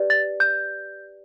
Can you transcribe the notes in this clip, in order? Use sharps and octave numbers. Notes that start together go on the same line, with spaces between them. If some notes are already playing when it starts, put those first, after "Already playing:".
Already playing: G4 B4 D5
A6
G6